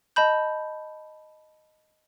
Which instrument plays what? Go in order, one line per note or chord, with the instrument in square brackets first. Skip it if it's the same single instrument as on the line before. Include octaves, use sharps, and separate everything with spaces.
[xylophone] D#5 A5 B5 G6